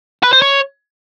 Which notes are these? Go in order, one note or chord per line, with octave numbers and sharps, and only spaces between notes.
B4
C5
C#5